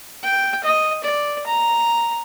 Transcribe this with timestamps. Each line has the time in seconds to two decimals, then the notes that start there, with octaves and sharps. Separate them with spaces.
0.23 G5
0.64 D#5
1.04 D5
1.47 A#5